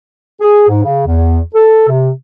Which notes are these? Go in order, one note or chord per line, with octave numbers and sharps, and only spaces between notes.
G#4
G#2
C#3
E2
A4
C3